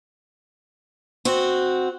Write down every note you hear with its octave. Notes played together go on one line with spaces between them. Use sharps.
C4 F#4